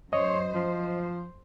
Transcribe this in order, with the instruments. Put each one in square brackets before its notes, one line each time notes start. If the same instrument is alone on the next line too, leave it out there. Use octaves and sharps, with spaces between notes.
[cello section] F#2 C5 [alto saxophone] C#5 [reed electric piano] D#5
[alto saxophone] F3 [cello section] C5